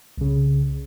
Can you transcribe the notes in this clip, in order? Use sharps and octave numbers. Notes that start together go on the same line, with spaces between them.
C2 C#3